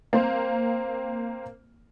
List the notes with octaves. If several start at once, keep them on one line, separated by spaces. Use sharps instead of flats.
A#3 C4 C5